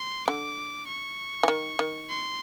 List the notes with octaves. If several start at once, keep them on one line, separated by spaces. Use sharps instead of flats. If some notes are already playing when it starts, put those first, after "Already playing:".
Already playing: C6
D3 D6
C#6
E3
D#3
D#3
C6